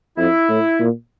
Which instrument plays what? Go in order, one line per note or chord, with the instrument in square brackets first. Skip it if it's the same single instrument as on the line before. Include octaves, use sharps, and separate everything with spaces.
[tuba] F2 [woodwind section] E4
[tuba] A2
A#2